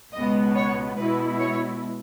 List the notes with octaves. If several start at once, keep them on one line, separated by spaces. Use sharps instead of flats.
C#2 B2 G#3 B3 D#5
C#5
B2 G#3 B3 E4 B4
C#5